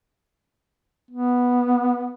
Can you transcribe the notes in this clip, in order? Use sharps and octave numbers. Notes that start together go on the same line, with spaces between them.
B3